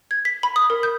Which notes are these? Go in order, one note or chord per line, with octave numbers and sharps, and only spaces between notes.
G#6
B6
B5
D#6
A#4
G6